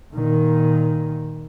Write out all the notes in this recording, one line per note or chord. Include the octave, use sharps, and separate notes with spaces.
A#2 D#3